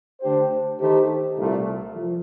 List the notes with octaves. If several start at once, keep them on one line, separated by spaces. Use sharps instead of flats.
D3 A3 D4 G4 C5
D#3 A3 D#4 G4 C5
C2 A#2 A3
F3